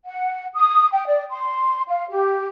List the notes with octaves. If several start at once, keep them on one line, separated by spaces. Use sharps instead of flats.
F#5
D#6
G5
D5
C6
F5
G4